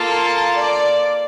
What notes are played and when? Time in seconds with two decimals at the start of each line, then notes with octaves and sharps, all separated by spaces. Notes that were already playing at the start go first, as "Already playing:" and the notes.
Already playing: A#3 F4 A4 A5
0.57 D5